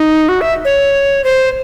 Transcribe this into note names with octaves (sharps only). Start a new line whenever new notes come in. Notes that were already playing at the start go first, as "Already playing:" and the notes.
Already playing: D#4
F#4
E5
C#5
C5